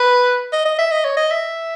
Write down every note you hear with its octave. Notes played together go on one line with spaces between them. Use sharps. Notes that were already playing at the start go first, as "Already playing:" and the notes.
Already playing: B4
D#5
D#5
E5
D#5
C#5
D#5
E5